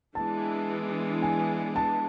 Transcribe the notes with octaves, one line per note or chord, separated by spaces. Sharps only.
E3 G#3 B3 D4 A5
G#5
A5